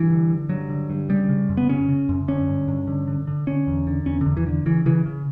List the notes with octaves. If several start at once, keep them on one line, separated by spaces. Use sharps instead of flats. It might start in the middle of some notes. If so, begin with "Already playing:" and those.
Already playing: G2 E3
D3
D3
G2 F#3
D3
G2
C#3 G3
C#3
F#2
B3
C#3 C#4
C#3
F#2
D3 C#4
G2
G2
D3
D3
D3
D3 C#4
E2
D3
E2 C#4
D3
E2
E3
D3
C#3 E3
C#3 E3
C#3